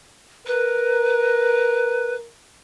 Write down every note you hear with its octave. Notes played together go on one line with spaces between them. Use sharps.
A#4 B4